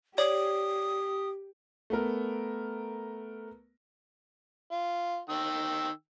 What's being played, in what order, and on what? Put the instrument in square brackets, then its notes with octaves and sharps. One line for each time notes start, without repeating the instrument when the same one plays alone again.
[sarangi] G4 [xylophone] C#5 [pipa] D5 [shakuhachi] D#6
[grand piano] A3 B3 A#4
[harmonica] F4
D#3 G5 E6